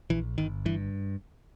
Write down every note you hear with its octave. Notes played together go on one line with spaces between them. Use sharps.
A#1 E3
G1 D#3
G2 E3